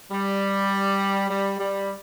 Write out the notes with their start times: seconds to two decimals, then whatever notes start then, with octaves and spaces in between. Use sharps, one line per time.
0.11 G3
1.29 G3
1.59 G3